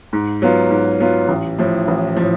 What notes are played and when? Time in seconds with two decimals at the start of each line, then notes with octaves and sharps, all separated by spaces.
0.13 G#2
0.42 F#3 B3 F4
0.71 G#2
1.00 F#3 B3 F4
1.29 A1
1.59 A2 F3
1.88 A1
2.16 A2 F3